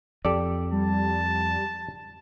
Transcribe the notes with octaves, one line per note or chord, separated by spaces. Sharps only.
F2 G4 A4 D5
G3 A5